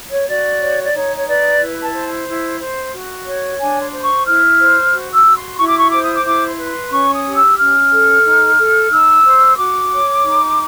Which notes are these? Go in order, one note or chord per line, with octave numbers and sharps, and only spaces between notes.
C#5
F#4 D5
C#5
D5
D#4 C#5
C#5
B4 D5
E4
A5
C5
E4
C5
F#4
C#5
D4 G#5
C6
C5
C#6
E4 F6
C5
F#4
E6
F#4
C6
E4 C#6
D6
C#6
C5 D6
D#6
D6
E4 D6
C6
B4
C6
C#4 C#6
D#6
G4
E6
C#4 F6
A4
D#4
A4
D#4 E6
C5
F#4 D6
C#5
D#4